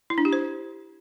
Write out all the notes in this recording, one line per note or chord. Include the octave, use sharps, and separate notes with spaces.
E4
D4
G4
C5